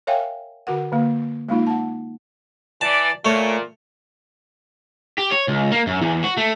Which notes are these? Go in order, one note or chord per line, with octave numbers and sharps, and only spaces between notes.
A#4 C#5 E5 F5 G5 G#5
D3 F#4 A#4 F#5
D3 A#3
G#3 A#3 D#4 F4
F#5 A5
E3 D5 A5
A#2 A3 C#5
G4
C#5
C#2
A#3
F#2
E2
F#4
A3